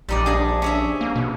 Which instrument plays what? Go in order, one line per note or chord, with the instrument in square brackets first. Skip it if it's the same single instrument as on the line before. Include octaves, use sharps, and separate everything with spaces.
[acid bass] A#1 [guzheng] G3 D#4 D5
[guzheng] D4 G#4 D#5
C#4 G#4 E5
[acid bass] A#3
B2